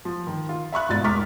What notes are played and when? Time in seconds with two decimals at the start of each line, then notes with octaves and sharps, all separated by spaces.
0.05 F3
0.27 D#3
0.49 F4
0.72 E5 B5 C#6 F#6
0.89 G#1 G#2 B2 F4 D5 A6
1.04 E1 A#5 C#6 D6 F6 B6